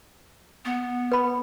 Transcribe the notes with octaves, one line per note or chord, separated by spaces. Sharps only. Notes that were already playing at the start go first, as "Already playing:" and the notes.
B3
B4 B5